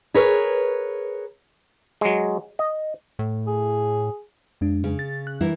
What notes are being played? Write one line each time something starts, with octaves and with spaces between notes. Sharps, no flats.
G#4 A#4 B4 C#5
F#3 G#3
D#5
A2
G#4
F2 G#3 D4
C#3
A6
F#6
E3 G3 E4 A#4